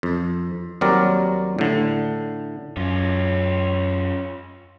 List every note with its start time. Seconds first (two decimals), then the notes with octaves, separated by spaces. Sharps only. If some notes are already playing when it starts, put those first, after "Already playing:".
0.03 F2
0.81 D#2 F#3 G3 C4 A#4 D5
1.59 A2 D3
2.77 F#2 C#4 F4